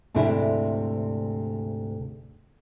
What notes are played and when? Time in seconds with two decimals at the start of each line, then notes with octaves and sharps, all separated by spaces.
0.14 D2 G#2 C3 D4 E4